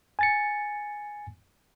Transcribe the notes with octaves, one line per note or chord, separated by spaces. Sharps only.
G#5 A6 C#7